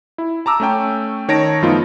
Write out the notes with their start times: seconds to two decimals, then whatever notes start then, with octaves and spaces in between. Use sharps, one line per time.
0.18 E4
0.46 A5 A#5 D6 E6
0.60 A3 C#4 G5
1.28 D#3 C#5 A5 A#6 D7
1.62 F#2 F3 A3 B3 D#4 F4